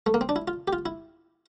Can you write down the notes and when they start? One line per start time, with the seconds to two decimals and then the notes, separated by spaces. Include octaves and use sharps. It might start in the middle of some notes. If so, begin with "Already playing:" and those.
0.06 A3
0.14 A#3
0.21 C4
0.29 D4
0.36 E4
0.48 F4
0.68 G4
0.73 F4
0.86 E4